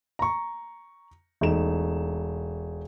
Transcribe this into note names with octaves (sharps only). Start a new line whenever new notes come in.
A#5 C#6
E1 A3 D#4 E7